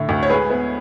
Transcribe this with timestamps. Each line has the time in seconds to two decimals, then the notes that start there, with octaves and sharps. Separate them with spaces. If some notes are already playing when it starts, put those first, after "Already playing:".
Already playing: A2 D3 A3
0.09 D2
0.23 C#5
0.29 G#3 G#4 B4
0.50 B3